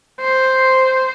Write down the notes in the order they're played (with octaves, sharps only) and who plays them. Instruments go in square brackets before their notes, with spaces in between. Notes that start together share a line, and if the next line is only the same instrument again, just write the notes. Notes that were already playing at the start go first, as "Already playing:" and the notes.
[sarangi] C5